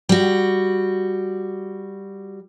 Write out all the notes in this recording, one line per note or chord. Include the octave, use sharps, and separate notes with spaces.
G3 F#4